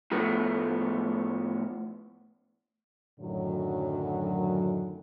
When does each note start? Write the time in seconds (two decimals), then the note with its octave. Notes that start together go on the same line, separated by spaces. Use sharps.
0.11 A2 F3 A3 B3
3.20 F#2 A2 D3 D#3 F#3